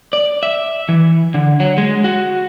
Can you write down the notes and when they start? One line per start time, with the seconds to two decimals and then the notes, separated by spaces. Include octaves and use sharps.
0.13 D5
0.43 E5
0.89 E3
1.34 D3
1.60 F#3
1.78 G#3
2.04 F#4